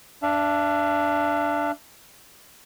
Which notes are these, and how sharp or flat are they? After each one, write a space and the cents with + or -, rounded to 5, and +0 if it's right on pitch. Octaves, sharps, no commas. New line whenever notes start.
D4 +0 E5 +45